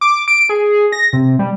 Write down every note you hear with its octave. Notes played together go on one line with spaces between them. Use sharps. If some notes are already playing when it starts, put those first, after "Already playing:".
D6
D7
G#4
A#6
C3
G3